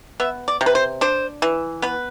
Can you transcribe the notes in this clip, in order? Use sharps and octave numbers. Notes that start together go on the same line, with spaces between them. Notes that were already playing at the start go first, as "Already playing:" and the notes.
B3 E5
D5
C3
B4
C5
D4 C5
E3
B3 B4